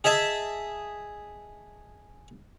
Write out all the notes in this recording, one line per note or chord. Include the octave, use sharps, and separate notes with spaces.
G#4 D#5 E5 A5